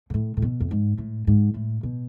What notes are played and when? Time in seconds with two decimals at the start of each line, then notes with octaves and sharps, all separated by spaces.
0.10 G#2
0.14 A2
0.37 A2
0.42 B2
0.60 F2
0.71 G#2
0.98 A2
1.27 G#2
1.54 A2
1.83 B2